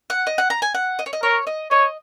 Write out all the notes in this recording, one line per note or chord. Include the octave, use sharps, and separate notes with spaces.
F#5
D#5
F#5
A#5
G#5
F#5
D#5
C#5
D#5
A#4 C#5
D#5
C#5 D#5